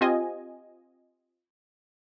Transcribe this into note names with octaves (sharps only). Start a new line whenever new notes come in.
C4 F4 G4 D#5 G#5